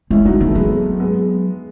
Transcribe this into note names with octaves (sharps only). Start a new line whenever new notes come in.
G#3 C#4 E4
F#3 D#4 F#4
E3 B3
A3
F#3 G#3 B3
G#3 B3